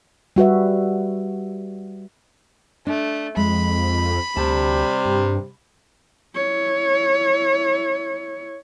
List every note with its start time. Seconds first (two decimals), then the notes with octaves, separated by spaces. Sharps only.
0.36 G3 F#4 B4 E5
2.87 A3 D4
3.37 F2 G#3 B5
4.36 D2 C3 G3 A5
5.06 G2
6.35 E4 C#5